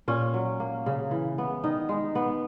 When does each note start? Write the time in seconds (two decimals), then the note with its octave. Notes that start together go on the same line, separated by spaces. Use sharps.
0.08 A#2 C#4
0.34 F#3
0.60 A#3
0.86 C#3
1.11 E3
1.38 B3
1.64 D#3 D#4
1.89 G#3
2.15 B3